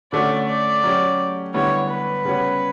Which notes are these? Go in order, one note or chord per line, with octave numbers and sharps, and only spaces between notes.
D3 A3 C#4 F#4 D5
D5
F#3 C#4 G4
D3 G3 B3 E4 C#5
B4
C#3 G3 B3 F#4 C#5